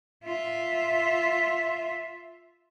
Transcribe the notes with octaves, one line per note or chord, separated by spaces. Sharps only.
F4 E5